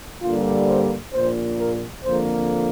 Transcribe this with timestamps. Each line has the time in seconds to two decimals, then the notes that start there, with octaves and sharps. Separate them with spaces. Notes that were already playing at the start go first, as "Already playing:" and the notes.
0.22 G2 D3 G3 A#3 F4
0.67 C5
1.12 A#1 A#2 A#3 C5
1.59 A#4
2.04 F2 D3 F3 A#3 C5